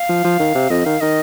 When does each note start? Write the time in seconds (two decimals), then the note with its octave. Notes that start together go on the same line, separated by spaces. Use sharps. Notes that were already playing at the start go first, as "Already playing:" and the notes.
Already playing: F5
0.09 F3
0.24 F3
0.40 D#3
0.55 C3
0.70 F2 D#5
0.85 D#3 F5
1.01 D#3 D#5